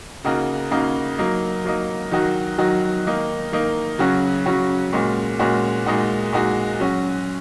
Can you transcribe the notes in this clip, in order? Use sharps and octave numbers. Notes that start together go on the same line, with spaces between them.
C#3 A#3 D#4 F#4
C#3 A#3 D#4 F#4
F#3 A#3 D#4
F#3 A#3 D#4
D#3 F#3 D#4 F#4
D#3 F#3 D#4 F#4
D#3 A#3 D#4
D#3 A#3 D#4
C#3 F#3 C#4 F#4
C#3 F#3 C#4 F#4
A#2 G#3 C#4 F#4
A#2 G#3 C#4 F#4
A#2 G#3 D#4 F#4
A#2 G#3 D#4 F#4
F#3 C#4 F#4